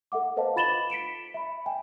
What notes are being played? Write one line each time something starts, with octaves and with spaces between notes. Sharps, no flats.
A4 E5 F#5 D6
A4 B4 C5 D#5 F5 A5
F4 B5 A6 E7 F#7 G7
B6 C#7 D7 E7
E5 B5
E5 G5 G#5